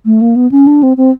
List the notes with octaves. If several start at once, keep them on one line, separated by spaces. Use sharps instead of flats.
A3
A#3
B3
C#4
D4
C4
C4